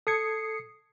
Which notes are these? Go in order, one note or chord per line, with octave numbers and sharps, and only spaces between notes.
A4 D#6 G#6 C7 C#7